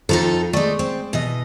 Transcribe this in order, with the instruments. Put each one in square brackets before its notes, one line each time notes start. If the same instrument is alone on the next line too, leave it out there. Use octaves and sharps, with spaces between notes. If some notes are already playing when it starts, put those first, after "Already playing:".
[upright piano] F2 [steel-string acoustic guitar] D#4 F4 A4
[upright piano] G#3 D5 [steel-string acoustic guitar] A3 D#4
[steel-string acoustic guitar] C4
B2 E3 D#5